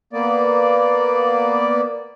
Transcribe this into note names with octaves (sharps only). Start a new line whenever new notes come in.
A#3 B3 D5